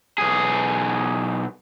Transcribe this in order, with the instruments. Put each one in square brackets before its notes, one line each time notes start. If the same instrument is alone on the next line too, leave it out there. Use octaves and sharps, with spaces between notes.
[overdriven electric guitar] B1 G#4